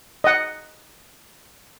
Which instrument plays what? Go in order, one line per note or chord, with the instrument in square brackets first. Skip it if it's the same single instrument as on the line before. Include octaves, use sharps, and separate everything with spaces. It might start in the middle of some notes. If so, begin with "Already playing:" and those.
[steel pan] D#5 F#5